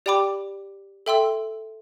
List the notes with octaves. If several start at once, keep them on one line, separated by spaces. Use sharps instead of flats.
G4 D5 G5 B5 D6
A4 E5 G5 C6 E6